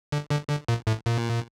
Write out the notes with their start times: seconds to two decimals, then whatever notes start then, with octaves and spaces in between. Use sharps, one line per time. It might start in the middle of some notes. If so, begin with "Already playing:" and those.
0.12 D3
0.31 D3
0.49 D3
0.68 A#2
0.87 A2
1.06 A#2